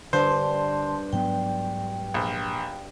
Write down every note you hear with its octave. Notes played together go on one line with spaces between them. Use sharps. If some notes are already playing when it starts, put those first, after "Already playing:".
G2 D3 C5 A5 C6
G#2 F#3 B3 G5
A#1